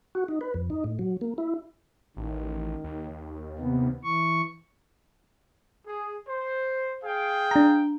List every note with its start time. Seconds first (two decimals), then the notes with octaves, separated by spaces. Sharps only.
0.15 F#4
0.28 D#4
0.41 B4
0.54 F2
0.70 D#4
0.84 A2
0.99 F#3
1.21 A#3
1.38 E4
2.17 A1 D#3
2.84 D#2
3.59 C3 B3
4.04 E3 C#6
5.86 G#4
6.28 C5
7.04 G#4 F5 G5
7.51 D4 A#5